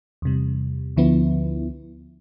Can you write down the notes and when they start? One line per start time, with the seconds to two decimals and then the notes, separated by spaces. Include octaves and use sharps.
0.22 E2 C3 G3
0.97 D2 D3 F3 B3 E4